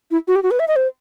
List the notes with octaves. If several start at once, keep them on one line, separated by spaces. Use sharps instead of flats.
E4
F#4
G4
F#4
B4
E5
D#5
C5